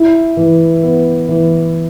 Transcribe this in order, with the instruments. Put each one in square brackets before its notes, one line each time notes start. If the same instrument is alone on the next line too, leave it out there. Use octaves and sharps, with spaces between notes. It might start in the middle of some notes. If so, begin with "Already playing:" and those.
Already playing: [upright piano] E4
E3
B3
E3